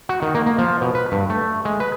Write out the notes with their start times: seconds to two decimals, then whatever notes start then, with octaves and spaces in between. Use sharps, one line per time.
0.09 F#4
0.22 D#3
0.35 A#3
0.46 A#3
0.58 F3
0.81 B2
0.95 B4
1.12 G2
1.30 A3
1.65 G#3
1.80 B4